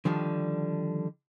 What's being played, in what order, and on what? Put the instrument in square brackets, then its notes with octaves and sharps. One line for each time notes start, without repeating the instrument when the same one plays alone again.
[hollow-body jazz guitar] D3 D#3 F3 G3